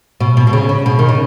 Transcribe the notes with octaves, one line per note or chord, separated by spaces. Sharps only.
B2
B2
B2
C#3
C#3
B2
D#3
C#3